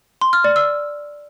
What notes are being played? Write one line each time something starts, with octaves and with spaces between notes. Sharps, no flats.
C6
F6
D5
E6